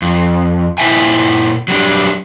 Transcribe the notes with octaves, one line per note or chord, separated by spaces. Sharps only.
F2
A#2 E4 C5 E5 G5 G#5
F#3 G3 D4